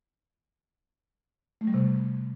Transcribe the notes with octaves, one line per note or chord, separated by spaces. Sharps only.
A3
G3
C3